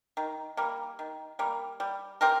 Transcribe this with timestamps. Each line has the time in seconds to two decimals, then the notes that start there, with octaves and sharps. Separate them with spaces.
0.17 D#3
0.57 G3 A#3
0.99 D#3
1.39 G3 A#3
1.80 G3
2.21 C4 G4 A#4